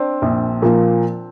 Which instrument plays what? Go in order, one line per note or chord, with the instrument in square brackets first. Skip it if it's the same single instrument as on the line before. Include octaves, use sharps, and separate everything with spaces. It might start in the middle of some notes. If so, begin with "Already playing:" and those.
Already playing: [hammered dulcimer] C4 D4
[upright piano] A#1
A#2 F3 A#3 F4